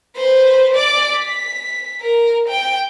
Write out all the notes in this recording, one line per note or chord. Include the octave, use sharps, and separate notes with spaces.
B4 C5
D5 D6
B6
A#4
G5